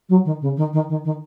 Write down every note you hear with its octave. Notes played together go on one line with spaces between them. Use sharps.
F#3
D#3
C#3
D#3
D#3
D#3
D#3